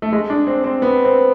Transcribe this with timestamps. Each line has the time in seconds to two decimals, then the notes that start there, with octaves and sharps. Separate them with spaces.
0.02 A3
0.13 G#3
0.30 D4
0.47 C4
0.64 C4
0.82 B3
1.05 C4